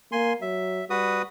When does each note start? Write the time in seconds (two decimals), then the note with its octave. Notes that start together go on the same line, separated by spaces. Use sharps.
0.12 A#3 G#5 C6
0.42 F#3 E5
0.90 G3 F#4 B4 D#6